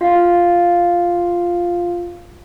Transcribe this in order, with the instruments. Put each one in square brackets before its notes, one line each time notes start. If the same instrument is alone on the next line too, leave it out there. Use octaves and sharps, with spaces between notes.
[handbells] F4 F5